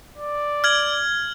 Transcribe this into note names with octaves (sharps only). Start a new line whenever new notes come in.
D5
F6 G#6 F#7